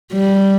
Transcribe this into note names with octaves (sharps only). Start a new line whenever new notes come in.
G3